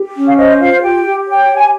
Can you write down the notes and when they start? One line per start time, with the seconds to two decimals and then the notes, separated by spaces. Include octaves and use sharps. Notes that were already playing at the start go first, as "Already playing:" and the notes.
Already playing: G4
0.14 C#4
0.27 F5
0.36 C5 D#5
0.59 F4 F5
0.81 G4 G5
1.05 G4
1.27 C#5 G5
1.50 G4
1.56 G#5